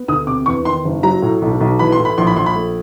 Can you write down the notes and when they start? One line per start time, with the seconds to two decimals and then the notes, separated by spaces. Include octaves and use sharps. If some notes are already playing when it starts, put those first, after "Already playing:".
Already playing: B3
0.08 D2 D#6
0.27 C3 D6
0.46 E2 C#6
0.65 D#3 C6
0.85 F#1
1.03 F#3 A#5
1.22 A2
1.42 B1
1.60 B1
1.79 E3 B5
1.92 C6
1.99 A2
2.05 B5
2.18 A#1 C6
2.27 B5
2.36 A#1 C6
2.46 B5
2.55 A3